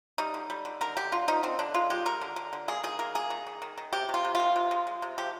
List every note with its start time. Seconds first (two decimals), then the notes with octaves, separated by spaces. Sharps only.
0.18 G3 D#4
0.34 D3
0.50 G3
0.65 D3
0.81 D3 A#4
0.97 D3 G4
1.12 D3 F4
1.28 F3 D#4
1.43 D3 C4
1.59 D3 D4
1.74 G#3 F4
1.90 G#3 G4
2.05 G3 A#4
2.21 D3
2.36 D3
2.53 D3
2.68 A#3 G#4
2.84 D#3 G#4
2.99 A#3 A#4
3.15 A#3 G#4
3.30 D#3
3.47 D#3
3.62 D#3
3.78 D#3
3.93 C3 G4
4.09 C3
4.14 F4
4.24 C3
4.35 D#3 F4
4.56 C3
4.71 G#3
4.87 G#3
5.02 C3
5.18 F3 G4